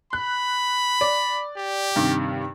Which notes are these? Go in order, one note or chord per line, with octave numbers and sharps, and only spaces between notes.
B5 F#6
D5
G4
G2 C3 D#3